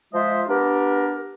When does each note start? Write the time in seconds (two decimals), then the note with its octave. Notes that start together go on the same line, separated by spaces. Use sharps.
0.14 F3 G#3 F4 C5 D#5 E5
0.49 B3 D4 G4 A#4